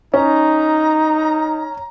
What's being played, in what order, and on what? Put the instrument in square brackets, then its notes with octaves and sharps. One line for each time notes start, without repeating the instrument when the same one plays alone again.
[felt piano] C#4 [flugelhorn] D#4 [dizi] A#5